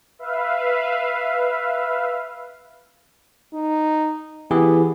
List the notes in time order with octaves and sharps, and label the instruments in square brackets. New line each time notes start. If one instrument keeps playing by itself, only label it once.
[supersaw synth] B4 E5 F5
[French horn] D#4
[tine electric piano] E3 G4 G#4 [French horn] B3